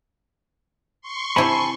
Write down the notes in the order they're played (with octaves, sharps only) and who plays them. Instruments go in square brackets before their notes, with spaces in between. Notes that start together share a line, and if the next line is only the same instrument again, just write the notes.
[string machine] C6 C#6
[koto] C3 E4 G4 [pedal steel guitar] G#5 A5 B5